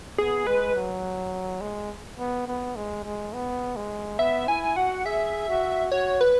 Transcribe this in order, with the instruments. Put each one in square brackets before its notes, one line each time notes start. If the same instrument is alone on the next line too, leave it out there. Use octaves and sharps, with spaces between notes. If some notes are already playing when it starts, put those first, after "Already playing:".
[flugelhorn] B3 [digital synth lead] G#4
[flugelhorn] G#3 [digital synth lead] B4
[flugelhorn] F#3
G#3
B3
B3
G#3
G#3
B3
G#3
[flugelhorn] B3 [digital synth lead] E5
[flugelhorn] E4 [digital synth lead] G#5
[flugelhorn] F#4 [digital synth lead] F#5
[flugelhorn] G#4 [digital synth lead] E5
[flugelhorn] F#4
[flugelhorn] F#4 [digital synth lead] C#5
[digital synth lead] B4